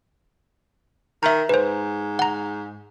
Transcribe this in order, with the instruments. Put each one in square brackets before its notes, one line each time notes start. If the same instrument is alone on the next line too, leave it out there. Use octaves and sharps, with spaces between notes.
[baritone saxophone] D#3 [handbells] E5 A#5
[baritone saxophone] G#2 [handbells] B4 C5
[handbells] F#5 A#5